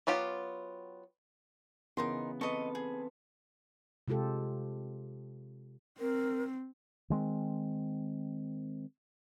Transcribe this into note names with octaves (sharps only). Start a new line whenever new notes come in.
F#3 B3 F4 G4
C#3 E3 B3 D#4 A#4 C6
C4 A4 B4 D#5 C#6
G#4
C3 G#3 F4 G4 A4
C4 A#4
D#3 G#3 C4